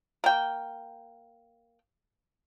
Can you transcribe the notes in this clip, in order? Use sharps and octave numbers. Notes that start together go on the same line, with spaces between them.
A#3 G5